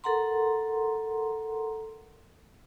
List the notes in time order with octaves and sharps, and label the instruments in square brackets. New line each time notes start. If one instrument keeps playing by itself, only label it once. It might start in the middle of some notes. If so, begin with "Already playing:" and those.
[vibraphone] A4 A#4 F#5 A#5 C6